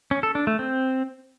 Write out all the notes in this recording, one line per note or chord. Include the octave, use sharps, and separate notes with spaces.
C#4
A4
D4
A3
C4